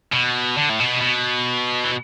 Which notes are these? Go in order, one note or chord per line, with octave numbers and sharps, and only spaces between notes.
B2
D3
A2
B2
B2
E3